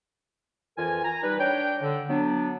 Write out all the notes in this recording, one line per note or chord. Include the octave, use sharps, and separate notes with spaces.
F2 E3 F4 A#4 G#5
G#5 A#5
G3 D#4 B4
D4 C#5 G5
D3
F#3 B3 D4